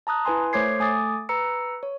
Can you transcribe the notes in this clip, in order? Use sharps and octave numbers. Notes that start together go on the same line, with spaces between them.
A5 A#5 D#6 F#6
E4 B4 G#5 C6
A3 C5 C#5 D6 G#6 C7
A3 G#5 D6 D#6 A6
B4 A#5 E6 C#7
C#5